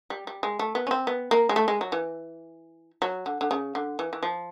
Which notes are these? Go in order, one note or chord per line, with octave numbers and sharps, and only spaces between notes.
G3
G3
G#3
A3
B3
C#4
C4
B3
A#3
G#3
A3
G#3
F#3
E3
F#3
D3
D3
C#3
D3
E3
E3
F3